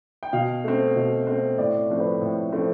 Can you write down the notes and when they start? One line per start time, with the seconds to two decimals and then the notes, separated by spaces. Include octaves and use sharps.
0.23 G5
0.33 B2 F5
0.64 A3 C4
0.96 B2
1.27 A3 C4
1.58 A2 D5
1.90 F3 A3 C4
2.00 B4
2.22 A2
2.52 F3 A3 C4